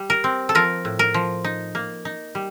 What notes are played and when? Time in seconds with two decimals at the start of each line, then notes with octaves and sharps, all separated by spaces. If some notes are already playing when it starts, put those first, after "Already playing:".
Already playing: G3
0.10 A#4
0.24 C4
0.49 A4
0.55 F3 A#4
0.85 A2
0.99 A#4
1.14 F3
1.44 D#4
1.75 A#3
2.05 D#4
2.35 G3